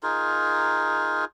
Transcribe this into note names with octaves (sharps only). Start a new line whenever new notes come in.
D#4 F4 G#4 A#4